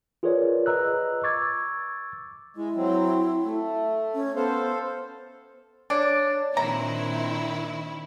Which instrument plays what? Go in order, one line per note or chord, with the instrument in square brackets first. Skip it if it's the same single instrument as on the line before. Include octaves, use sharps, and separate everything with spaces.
[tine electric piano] F4 G#4 A#4 B4 C#5 D5
B4 D#5 A#5 E6 F#6
C#6 D6 E6 G#6 A6
[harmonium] G#3 [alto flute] E4
[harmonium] F#3 C4
A3
[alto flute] C#4
[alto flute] B3 [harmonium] A4 C5 F5
[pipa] D4 [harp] C#5 D5
[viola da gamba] A#2 C4 D4 [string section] D#3 E4 [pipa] A#5